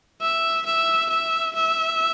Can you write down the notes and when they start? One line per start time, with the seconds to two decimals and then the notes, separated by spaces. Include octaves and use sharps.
0.21 E5
0.66 E5
1.10 E5
1.55 E5